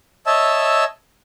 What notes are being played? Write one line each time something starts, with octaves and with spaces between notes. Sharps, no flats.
C#5 D#5 E5 A5 E6